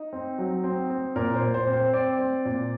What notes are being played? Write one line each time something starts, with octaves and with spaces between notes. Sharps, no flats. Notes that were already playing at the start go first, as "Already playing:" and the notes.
Already playing: D#4
C4
F#3
C4
C4
A#2 A#4
C5
A#2
C5
C4
C5
C4 D5
C4
A#2